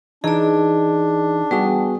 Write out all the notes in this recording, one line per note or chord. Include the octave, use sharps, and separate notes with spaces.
E3 D4 D#4 G#4 D5
G3 B3 F#4 G#4